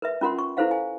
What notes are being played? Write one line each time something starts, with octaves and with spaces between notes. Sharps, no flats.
A#4 B4 E5
C#4 F4 A#4 F#5 C6
C#6
E4 A4 B4 C5 F5 F#5
G#5